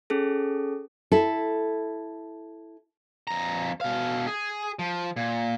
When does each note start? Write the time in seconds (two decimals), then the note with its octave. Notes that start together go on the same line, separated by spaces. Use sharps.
0.10 C#4 G#4 A4
1.12 E4 A4
3.27 F2 A#5
3.81 B2 F5
4.27 G#4
4.79 F3
5.16 A#2